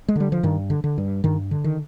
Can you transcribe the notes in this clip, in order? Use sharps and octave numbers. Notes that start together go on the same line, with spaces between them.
G#3
D3 G3
F3
G2 D#3
D3
D3
G2
G2 D#3
D3
D#3